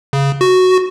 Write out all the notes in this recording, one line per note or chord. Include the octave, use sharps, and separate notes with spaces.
C#3
F#4